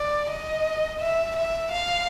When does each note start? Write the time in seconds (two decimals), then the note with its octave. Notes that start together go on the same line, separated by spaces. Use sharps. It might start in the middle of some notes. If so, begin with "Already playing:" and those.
Already playing: D5
0.30 D#5
1.00 E5
1.36 E5
1.72 F5